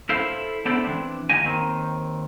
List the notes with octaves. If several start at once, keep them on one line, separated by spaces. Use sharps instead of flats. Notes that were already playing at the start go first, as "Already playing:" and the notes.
E4 A4 C5 F5
B3 D4 E4 A4 C5 D5
E3 F#3 C4 D4
D#2 A#3 G4 D#5 G#5
D#2 D#3 C4